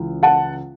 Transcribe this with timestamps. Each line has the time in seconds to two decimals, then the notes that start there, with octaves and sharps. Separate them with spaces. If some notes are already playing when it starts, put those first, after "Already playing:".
Already playing: C#2 C#3 E3
0.23 F#5 A5